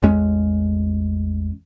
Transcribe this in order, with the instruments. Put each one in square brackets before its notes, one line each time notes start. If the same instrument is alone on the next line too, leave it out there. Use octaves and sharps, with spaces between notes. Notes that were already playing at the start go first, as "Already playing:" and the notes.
[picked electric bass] A1 E2 G#3 C#4